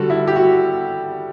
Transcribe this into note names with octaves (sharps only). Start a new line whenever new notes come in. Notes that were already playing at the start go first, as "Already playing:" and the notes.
Already playing: D3 G3 F#4 A4
E4
G4
F#4